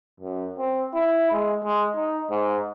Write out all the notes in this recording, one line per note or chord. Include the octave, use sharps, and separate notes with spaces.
F#2
C4
E4
G#3
G#3
D#4
G#2